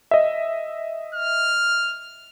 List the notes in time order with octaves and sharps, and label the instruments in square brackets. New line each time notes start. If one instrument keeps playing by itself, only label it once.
[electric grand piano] D#5 E5
[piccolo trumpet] F6